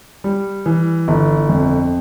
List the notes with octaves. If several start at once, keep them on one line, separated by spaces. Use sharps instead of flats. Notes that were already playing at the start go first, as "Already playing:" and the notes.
G3
E3
G1
F2